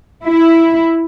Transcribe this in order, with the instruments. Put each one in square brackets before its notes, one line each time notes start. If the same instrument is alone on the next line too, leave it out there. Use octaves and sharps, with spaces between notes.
[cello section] E4